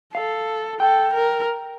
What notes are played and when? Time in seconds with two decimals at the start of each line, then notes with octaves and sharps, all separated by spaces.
0.14 A4 F5
0.80 A4 G5
1.14 A#4